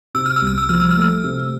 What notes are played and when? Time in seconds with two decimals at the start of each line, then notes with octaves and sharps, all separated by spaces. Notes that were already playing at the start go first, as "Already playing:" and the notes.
0.14 C3 E6
0.26 F6
0.36 E6
0.42 C2
0.47 F6
0.58 E6
0.69 F3 F6
0.80 E6
0.91 F6
0.97 A3 E6
1.24 C3